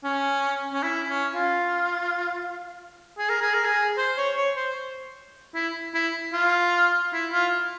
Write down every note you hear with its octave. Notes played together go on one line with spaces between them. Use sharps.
C#4
C#4
E4
C#4
F4
G#4
A#4
G#4
A#4
G#4
C5
C#5
C#5
C5
E4
E4
F4
E4
F4